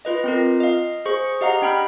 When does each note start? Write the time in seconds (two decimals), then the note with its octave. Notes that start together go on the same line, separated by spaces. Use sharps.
0.05 F4 B4 D#5
0.24 C4 F4 A#4
0.60 D#5 F5
1.06 G#4 C5 C#6
1.41 G4 D#5 F5 F#5 A#5
1.62 D4 G5 B5 F6